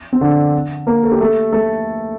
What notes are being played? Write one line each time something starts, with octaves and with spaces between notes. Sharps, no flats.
C4
D3 D4
A#3 A#4
A4
G4
A3 A4
A3 A4